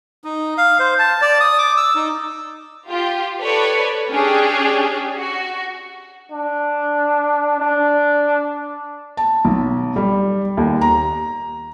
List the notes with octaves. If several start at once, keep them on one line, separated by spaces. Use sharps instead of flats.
D#4
F5
C5
A5
D5
D#6
D6
E6
D#4
F4 G4
A4 B4 C#5 D5
C#4 D4 G4 G#4
F#4
D4
D4
A5
B1
G3
D#2
A#5